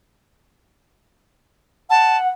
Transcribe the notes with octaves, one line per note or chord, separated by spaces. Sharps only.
F#5 A5